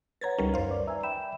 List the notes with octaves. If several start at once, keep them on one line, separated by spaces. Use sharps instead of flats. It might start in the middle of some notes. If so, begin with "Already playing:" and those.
B4 C#5 F#5 A#5 G#6 A6
C#2 G3 C#4 D#4 A#4
F#2 B4 C5 F5
D5
D5 E5 G#5 A#5 E6
E5 G5 B5 E7